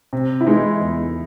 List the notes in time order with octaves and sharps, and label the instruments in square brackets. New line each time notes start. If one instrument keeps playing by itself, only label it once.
[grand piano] C3
[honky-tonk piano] E4
[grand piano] E3 G#3 [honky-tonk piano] D#4
[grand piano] E2